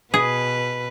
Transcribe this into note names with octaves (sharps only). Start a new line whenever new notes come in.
B2 G#4 B4